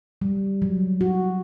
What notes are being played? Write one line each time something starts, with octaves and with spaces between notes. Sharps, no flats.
G3
F#3
F#4